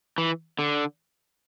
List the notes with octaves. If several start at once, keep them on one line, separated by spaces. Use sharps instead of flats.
E3
D3